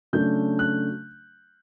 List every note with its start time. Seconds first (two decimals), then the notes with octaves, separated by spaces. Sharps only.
0.13 C#3 F#3 A3 D4 G6
0.59 F#6